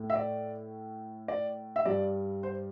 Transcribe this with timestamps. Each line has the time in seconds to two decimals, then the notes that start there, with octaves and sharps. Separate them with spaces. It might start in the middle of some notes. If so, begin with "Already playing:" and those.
Already playing: A2 A3
0.10 E5
0.15 D5
1.28 D5
1.76 E5
1.85 G2 G3 D5
2.43 C5